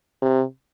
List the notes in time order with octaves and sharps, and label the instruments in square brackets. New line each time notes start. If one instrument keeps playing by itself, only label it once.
[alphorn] C3